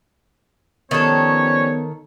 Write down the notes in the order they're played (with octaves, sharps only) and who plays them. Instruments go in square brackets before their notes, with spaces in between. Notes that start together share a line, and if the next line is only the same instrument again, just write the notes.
[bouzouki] D#3 A4 [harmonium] F3 G3 C#4 [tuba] B3 [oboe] C#5